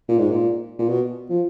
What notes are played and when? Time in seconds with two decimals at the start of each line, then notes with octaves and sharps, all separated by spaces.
0.09 A#2
0.19 G#2
0.31 A#2
0.79 A#2
0.89 B2
1.30 F3